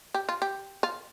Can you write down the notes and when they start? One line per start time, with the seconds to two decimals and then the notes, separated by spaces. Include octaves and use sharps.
0.14 G4
0.29 F4
0.42 G4
0.83 F4